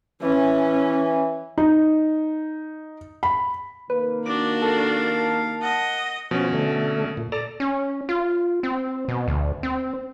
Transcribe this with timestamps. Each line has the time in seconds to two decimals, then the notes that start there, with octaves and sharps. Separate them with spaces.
0.22 E3 C#4
1.58 D#4
3.23 B5
3.90 C3 D#3 A#3 B4
4.26 D4 F#4 D6
4.62 A4 A#4 F5
5.07 A5
5.63 D#5 F#5
6.31 B2 F3 C#4
6.53 D3 A3
7.17 A#2
7.32 A4 D5 A#5
7.60 C#4
8.09 F4
8.63 C4
9.08 B2
9.28 D2
9.63 C4